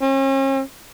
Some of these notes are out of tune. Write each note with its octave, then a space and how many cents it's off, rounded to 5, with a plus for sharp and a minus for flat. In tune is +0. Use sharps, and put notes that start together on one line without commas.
C#4 -40